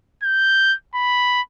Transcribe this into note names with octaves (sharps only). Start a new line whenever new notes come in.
G6
B5